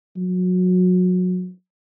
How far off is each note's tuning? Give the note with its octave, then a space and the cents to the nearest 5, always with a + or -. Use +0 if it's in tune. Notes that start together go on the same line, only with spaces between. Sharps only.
F#3 -25